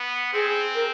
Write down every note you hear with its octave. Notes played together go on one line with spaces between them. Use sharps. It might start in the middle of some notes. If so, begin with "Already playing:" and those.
Already playing: B3
C4 G#4
A#4